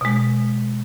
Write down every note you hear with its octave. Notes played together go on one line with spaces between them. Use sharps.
B2 G#3